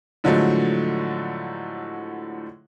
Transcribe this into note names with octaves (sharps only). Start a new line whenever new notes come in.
A2 D3 F3 F#3 G#3 A3